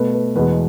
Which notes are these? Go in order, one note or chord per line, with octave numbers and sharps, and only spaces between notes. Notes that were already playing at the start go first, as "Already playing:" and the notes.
Already playing: B2 A3 B4
B4
E2 B2 G#3 B4